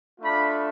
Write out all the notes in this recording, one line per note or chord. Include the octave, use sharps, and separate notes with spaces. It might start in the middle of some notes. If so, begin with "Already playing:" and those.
A3 D4 F4 B5